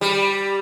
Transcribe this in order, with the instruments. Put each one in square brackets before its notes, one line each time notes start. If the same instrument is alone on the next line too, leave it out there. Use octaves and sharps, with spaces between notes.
[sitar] G3